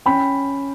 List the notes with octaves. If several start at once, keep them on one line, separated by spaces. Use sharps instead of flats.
C#4 G5 B5